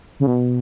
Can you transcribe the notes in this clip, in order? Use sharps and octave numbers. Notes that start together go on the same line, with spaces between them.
C#3
B2